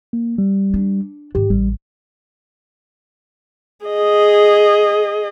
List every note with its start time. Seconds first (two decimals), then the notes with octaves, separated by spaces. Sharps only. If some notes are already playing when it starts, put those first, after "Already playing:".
0.13 A#3
0.38 G3
0.74 D4
1.35 G#2 D#3 G4
1.50 A1 G3
3.85 G#4 D#5